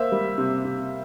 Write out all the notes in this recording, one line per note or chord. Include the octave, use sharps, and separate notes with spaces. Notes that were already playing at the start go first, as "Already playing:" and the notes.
Already playing: A#3 C5 E5
G3
C3
C3